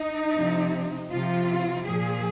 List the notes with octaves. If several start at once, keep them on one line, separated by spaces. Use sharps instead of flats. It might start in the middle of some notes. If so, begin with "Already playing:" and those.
Already playing: D#4
C3 F3
C3 F3 F4
A#2 F3 G#4